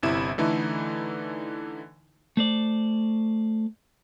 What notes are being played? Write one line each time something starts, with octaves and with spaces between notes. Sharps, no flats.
G1 C3 E4 E7
D3 E3 A3 D#4 E4
A3 C5 D5